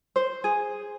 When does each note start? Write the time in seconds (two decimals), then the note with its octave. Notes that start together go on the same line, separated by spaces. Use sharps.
0.16 C5
0.44 G#4